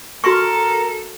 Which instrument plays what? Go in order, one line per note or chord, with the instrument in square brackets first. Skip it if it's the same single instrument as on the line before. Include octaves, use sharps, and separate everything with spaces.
[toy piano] F#4 C6 C#6 [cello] A4 [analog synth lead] A#4